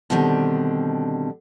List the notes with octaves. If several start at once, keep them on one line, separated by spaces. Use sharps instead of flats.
B2 D3 D#3 G3 C4 D4